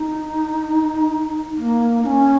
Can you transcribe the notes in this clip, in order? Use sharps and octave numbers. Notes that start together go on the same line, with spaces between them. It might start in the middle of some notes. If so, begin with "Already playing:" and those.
Already playing: D#4
A#3
D#4
C#4